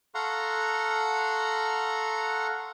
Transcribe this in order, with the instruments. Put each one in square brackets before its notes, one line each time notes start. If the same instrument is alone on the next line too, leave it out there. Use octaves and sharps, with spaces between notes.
[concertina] A4 F5 F#5 A#5 C6 C#6